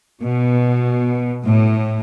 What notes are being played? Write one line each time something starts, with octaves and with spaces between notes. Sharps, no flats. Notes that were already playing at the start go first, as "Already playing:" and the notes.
B2
A2